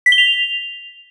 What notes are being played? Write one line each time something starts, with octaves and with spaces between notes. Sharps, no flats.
B6
G7
F7